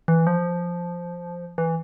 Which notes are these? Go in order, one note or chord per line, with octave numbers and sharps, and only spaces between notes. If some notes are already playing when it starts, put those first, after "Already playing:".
E3
F3
E3